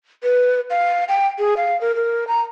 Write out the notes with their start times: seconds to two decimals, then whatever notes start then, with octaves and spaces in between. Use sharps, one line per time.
0.23 B4
0.70 F5
1.08 G5
1.39 G#4
1.57 F5
1.81 A#4
1.96 A#4
2.27 A#5